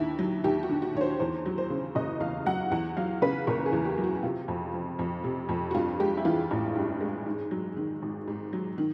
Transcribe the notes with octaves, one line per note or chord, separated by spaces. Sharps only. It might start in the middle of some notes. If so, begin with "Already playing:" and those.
Already playing: D#2 D3 E4
F#3
D#2 G4
F#4
D3
F#4
D#2 C#5
C5
E2 C5
F#3
C5
C#3
F#1 D#5
E2 F5
F#3 F#5
E2 F#5
F#3 F5
C#3 B4
F#1 A#4
G#4
E2
G4
F#3
F#4
C3 F4
F2
F3
F2
C3
F2
F#4
G2 F4
G#3 G4
E4
E3 F4
A1
G2
G#3
G#2
F#3
D#3
G#1
G#2
F#3
D#3